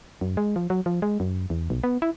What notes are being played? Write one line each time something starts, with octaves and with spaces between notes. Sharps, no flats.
F#2
G#3
F3
F#3
F3
G#3
F#2
E2
B1
B3
E4